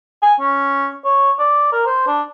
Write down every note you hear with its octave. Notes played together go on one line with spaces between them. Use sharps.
G#5
C#4
C#5
D5
A#4
C5
D4